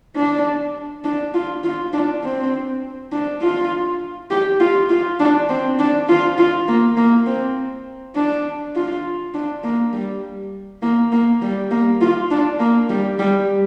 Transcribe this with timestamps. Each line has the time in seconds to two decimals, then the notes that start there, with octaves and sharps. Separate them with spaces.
0.16 D4
1.05 D4
1.34 F4
1.64 F4
1.93 D4
2.23 C4
3.12 D4
3.42 F4
4.30 G4
4.60 F4
4.89 F4
5.19 D4
5.49 C4
5.79 D4
6.08 F4
6.38 F4
6.67 A#3
6.97 A#3
7.26 C4
8.15 D4
8.75 F4
9.34 D4
9.63 A#3
9.93 G3
10.82 A#3
11.12 A#3
11.42 G3
11.71 A#3
12.01 F4
12.30 D4
12.59 A#3
12.89 G3
13.19 G3